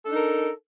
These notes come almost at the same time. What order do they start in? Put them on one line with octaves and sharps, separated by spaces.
A4 D4 D#4 A#4